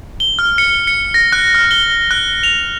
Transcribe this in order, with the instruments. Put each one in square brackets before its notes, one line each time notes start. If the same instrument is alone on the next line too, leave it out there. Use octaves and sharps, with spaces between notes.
[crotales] G7
F6
C#7
C#7
A#6
F#6
F6
G7
F#6
F7